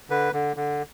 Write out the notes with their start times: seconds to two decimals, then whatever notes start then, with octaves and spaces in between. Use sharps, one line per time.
0.10 D3 B4
0.33 D3
0.56 D3